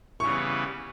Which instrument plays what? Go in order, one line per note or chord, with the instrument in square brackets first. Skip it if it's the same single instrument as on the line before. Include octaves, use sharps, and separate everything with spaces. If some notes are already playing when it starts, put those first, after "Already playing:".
[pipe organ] C#3 E3 G3 B3 [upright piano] C#6